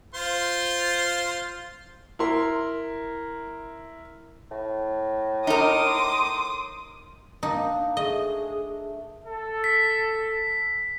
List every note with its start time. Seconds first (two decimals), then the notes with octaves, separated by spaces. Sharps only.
0.14 F4 C5 C6
2.19 E4 A#4 C6
4.51 A2
5.47 D#4 A#4 C6 D6 D#6
7.43 A#3 D4 D#4
7.97 A3 G#4 D#5
9.26 A4
9.64 B6